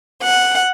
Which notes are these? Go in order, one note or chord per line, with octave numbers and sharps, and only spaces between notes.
F#5